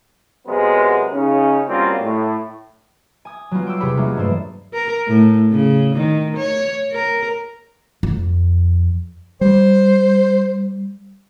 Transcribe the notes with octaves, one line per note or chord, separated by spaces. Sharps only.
C3 F#3 G#3 B3 A#4 C5
C#3 C#4 D#4
F#3 G3 A#3 C4 C#4 F4
A2
G#5 D#6 G#6
F#3 G3 B3 F4
G5 C6 D6 E6 G6
E2 C3 G4 G#4 C#5 B5
F#3 G#3 A#3 C#4 F4 F#4
G2 E3 A3 A4 C5 D#6
A#4
A2
C#3
D#3
C#5
A#4
F2
G3 C5